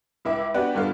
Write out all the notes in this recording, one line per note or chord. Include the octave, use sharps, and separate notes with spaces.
C#2 E4 E5 D6
B3 D4 F#4 G4 B4
G2 D3 B3 F4